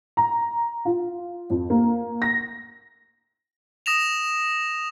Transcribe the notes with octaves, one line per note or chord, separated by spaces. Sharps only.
A#5
F4
F2
A#3
A#6
D#6 A#6 E7 F7